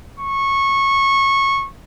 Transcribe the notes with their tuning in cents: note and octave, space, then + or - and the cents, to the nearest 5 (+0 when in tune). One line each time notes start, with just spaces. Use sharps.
C#6 -20